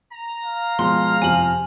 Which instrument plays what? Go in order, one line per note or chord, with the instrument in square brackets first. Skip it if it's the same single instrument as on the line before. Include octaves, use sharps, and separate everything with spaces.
[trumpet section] A#5
[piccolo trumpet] F5
[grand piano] B2 F3 G#3 [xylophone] C6
[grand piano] F2 C3 F3 [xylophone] G#5 F#7